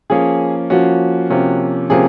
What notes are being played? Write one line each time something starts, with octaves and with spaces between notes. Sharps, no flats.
F3 A#3 C#4 G#4
F3 A#3 C#4 F#4
C3 F3 A#3 C#4
C3 F3 A#3 C#4 G#4